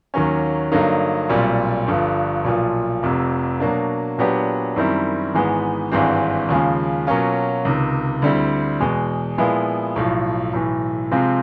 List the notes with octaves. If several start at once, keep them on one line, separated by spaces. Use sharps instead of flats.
D#2 D#3 F#3 A#3 C#4
G2 D3 F#3 A#3 D#4
B1 A#2 G3 C4
G1 G2 D3 F3
B1 A#2 F3
F1 F2 C3
B2 F#3 A#3 D4
A#2 F#3 B3 D4 G4
F#2 D#3 G3 C4 E4
G#1 G#2 E3 G#3 B3
G#1 G2 E3 G#3 C4
D#2 C#3 F3 G#3
B2 F#3 A#3 C#4 F4
C#2 C3 D#3
D2 D3 G3 C4 E4
E2 B2 G#3
A#2 F3 G#3 B3 E4
B1 A2 F3
B1 A2 E3
C3 F3 G#3 C4 F4